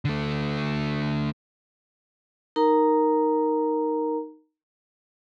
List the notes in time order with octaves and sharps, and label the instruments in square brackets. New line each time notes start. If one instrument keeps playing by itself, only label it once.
[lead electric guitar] D3 A3
[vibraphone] D#4 A#4 A#5